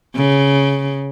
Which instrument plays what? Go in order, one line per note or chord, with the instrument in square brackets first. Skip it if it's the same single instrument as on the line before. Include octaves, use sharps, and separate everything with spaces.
[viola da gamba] C#3